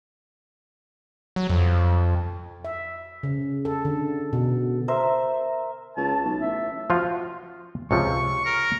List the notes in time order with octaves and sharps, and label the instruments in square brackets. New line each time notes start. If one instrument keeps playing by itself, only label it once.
[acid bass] F#3
F2
[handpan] E5
C#3
A4
D3
B2
[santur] A#4 C5 E5
[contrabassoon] C#2 [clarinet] A5
[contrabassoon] B1
[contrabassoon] A1 [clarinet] E5
[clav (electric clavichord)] F3 F4 F#4
[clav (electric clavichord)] C#2 C3 F3 [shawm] C#6
[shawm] A#4